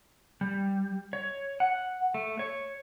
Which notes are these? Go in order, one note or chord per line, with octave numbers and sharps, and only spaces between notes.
G3
C#5
F#5
A3
C#5